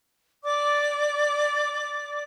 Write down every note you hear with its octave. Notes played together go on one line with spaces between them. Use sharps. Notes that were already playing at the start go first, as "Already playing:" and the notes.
D5 D6